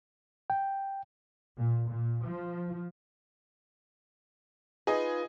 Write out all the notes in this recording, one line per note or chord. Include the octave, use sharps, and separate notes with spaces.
G5
A#2
A#2
F3
D#4 F4 G#4 B4 D#5